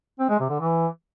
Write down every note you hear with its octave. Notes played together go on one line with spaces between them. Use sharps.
C4
G#3
C3
D3
E3